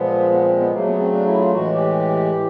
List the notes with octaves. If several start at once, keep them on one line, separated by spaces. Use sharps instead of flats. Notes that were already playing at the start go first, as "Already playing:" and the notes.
Already playing: A#2 F3 G#3 B3
B3
C4
B3
C#3 F#3 A3 A#3
B3
C4
D4
E4
F4
A2 E3 G#3 F#4
G4
A2 E3